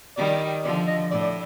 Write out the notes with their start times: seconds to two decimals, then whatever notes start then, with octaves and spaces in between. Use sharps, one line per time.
0.17 D#3 G3 D5
0.64 D3 F3 D5
0.87 D#5
1.11 A2 D5
1.22 D5